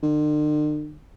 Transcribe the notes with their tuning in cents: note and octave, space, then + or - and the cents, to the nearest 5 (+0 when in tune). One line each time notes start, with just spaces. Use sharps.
D3 +45